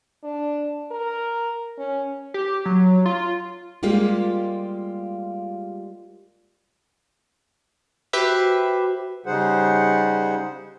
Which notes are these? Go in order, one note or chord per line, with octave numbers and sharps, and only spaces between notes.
D4
A#4
C#4
G4
F#3
F4
G3 G#3 A#3 F4 G4
F#4 G4 B4 C5 E5
C#3 G3 D#4 G#4 C5 F#5